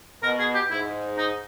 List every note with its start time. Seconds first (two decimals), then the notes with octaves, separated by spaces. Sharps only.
0.23 B2 A#4
0.39 G#4
0.55 G4
0.70 G#2 E4
1.18 D#4